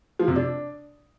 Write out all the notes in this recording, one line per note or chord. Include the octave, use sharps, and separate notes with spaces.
F3
C3
D4